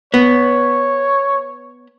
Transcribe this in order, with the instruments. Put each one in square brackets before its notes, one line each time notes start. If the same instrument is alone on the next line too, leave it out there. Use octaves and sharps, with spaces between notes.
[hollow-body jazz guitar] B3 [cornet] C#5